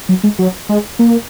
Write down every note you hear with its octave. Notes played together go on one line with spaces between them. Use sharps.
F#3
G#3
F#3
G#3
A#3